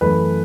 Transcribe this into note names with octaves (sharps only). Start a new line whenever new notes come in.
F#2 E3 A3 B4